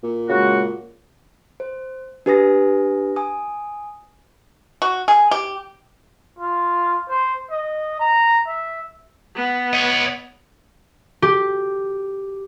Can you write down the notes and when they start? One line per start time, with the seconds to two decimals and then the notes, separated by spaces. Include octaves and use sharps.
0.03 A#2
0.28 C#3 G#3 F#4
1.60 C5
2.26 D4 G4 B4 G#5 D#6 A#6
3.16 G#5 D#6
4.82 F#4
5.08 G#4
5.31 G4
6.39 F4
7.08 C5
7.50 D#5
8.00 A#5
8.47 E5
9.35 B3
9.73 C#5 D#5
11.22 G4